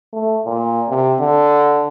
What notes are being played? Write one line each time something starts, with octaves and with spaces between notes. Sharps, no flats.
A3
A#2
C3
D3